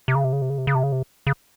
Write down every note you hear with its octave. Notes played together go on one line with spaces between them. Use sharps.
C3
C#3
C3
C#3
C3
C#3
C3
C#3
C3
C#3
C3
C#3